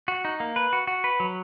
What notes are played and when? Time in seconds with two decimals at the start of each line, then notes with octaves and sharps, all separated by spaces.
0.08 F#4
0.25 D#4
0.40 A#3
0.56 B4
0.73 F#4
0.87 F#4
1.04 B4
1.20 F#3